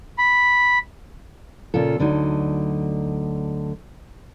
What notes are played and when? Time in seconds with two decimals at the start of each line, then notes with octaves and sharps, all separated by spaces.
0.18 B5
1.74 A#2 C#3 F4 A4
1.99 D2 D3 F#3 D#4